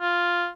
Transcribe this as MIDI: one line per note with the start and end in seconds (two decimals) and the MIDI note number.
0.01 0.48 65